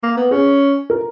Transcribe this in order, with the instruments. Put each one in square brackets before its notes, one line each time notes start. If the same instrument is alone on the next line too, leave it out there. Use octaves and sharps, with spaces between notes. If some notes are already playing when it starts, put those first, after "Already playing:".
[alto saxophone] A#3
B3
[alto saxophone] C#4 [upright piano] G#4
[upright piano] A#4